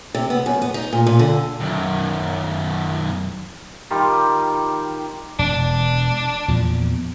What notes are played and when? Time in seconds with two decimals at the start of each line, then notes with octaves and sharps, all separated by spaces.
0.15 C3
0.30 B3
0.46 F#2
0.62 B3
0.74 D#4
0.93 A#2
1.07 A#2
1.19 D3
1.60 F#2 D#3
3.90 D#3 G3 F4 G4
5.39 E1 D4
6.48 E2 A#2 F3